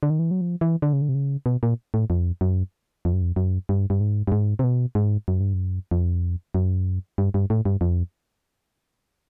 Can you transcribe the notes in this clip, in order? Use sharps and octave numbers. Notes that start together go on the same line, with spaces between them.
D3
D#3
E3
F#3
F3
E3
D3
C#3
D3
C3
C#3
B2
A#2
A2
F2
F#2
F2
F#2
F2
F#2
G2
G2
G#2
G2
G#2
C3
B2
G#2
F#2
G2
F#2
F2
F#2
G2
G2
A2
G2
F2